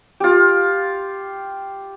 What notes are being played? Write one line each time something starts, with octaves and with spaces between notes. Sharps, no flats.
F4 G4